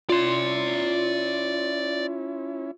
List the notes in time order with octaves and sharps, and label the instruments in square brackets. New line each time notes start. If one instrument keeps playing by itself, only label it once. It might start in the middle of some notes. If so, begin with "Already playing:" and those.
[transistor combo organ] C#4 E4 [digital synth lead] F4 [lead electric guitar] D5 C6